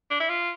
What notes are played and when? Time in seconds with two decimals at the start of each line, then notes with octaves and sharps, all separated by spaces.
0.10 D4
0.20 E4
0.29 F4